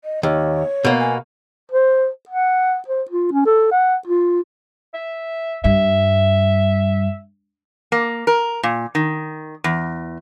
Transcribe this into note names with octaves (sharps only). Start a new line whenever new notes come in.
D#5
D#2 C#5
B2 A#3
G#5
C5
F#5
C5
F4
C#4
A4
F#5
F4
E5
G2 E5
A#3
A#4
A#2
D#3
E2